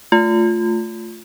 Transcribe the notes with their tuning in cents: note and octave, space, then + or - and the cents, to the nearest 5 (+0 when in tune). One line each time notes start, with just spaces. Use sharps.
A3 +0 F4 +0